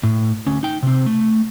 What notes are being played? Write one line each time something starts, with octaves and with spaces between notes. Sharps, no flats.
A2
D2 C#4
D#4 G5
C3 C4
A3